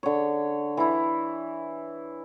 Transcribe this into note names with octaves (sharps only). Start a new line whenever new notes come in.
D3 C#5
E3 E4